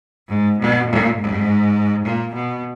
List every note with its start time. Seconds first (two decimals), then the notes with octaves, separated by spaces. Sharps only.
0.28 G#2
0.58 B2
0.86 A#2
1.16 G#2
2.05 A#2
2.34 B2